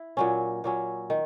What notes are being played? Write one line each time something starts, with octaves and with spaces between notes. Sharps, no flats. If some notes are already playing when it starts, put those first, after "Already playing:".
Already playing: E4
A#2 F#3 C#4
A#2 F#3 C#4
D#3